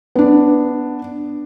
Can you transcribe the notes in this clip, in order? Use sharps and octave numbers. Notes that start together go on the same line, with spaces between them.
B3 D4